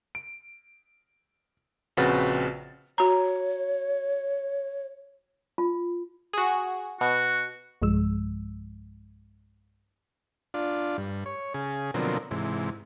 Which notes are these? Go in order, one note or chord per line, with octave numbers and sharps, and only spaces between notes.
D7
A#1 C#3 C4 F#4 B4 A6
F#4 C#5 A#5
F4
F#4 G#4
B2 F#4
B1 G2 F3 G#3 E6
D4 F4
G2
C#5
C#3 G#4
B2 D3 F3 F#3 A#3 C4
G#2 C3 E3